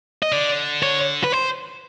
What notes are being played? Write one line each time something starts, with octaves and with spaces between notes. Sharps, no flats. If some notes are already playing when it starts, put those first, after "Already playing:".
D#5
D3 D5
C#5
B4
C5